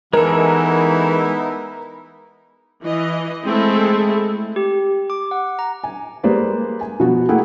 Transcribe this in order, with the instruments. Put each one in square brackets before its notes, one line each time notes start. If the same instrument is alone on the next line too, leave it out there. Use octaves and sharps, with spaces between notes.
[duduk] E3 [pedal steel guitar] G#3 A4 [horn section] B3 D#4 E4 [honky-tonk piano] A#4
[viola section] E3 D#5
G#3 A3 C4 E4 A4
[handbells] G4
D6
F#5
A#5
[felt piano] G#5
G3 G#3 A#3 B4 C5 D5
G#5
B2 F3 B3 F#4
A3 A#3 E4 G#4 F#5 G5